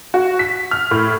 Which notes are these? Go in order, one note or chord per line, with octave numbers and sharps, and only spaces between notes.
F#4
B6
F6
A2